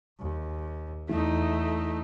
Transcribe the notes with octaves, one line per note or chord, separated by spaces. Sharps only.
D#2
E2 E3 A3 D#4